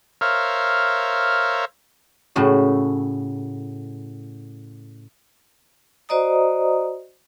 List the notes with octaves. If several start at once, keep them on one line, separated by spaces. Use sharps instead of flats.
A#4 C5 C#5 E5 F5
A2 C#3 F#4
F#4 C5 D5 D#5 A#5 D#6